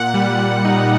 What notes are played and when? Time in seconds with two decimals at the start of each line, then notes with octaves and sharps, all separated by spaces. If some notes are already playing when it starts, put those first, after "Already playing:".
Already playing: A#2 F#5
0.14 G3
0.39 A#2
0.65 D#4